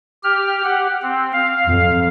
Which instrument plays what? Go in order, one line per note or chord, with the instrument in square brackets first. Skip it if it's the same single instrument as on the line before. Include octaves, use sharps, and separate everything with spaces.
[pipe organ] G4 F6
G4 F#5
C4
F5
[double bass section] F2